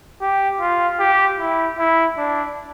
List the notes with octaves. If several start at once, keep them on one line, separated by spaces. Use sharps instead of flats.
G4
F4
G4
E4
E4
D4